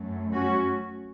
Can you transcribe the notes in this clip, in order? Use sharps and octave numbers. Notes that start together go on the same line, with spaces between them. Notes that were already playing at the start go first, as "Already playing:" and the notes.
Already playing: F#2 F#3 A3
C#4 F#4